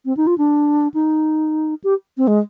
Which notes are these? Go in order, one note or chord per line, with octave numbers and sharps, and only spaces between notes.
C4
D#4
F4
D4
D#4
G4
C4
G#3